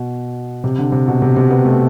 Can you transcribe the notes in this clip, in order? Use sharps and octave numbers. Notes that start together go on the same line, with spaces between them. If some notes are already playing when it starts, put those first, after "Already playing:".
Already playing: B2
C3
D3
C3
B2
C3
C3
B3
A3